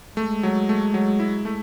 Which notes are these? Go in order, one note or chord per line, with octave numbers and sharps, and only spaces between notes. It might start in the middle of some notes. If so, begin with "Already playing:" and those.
G#3 A3
F#3
A3
F#3
E4
A3